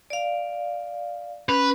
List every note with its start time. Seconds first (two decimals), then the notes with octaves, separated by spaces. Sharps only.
0.10 D5 F5
1.49 C#4 B4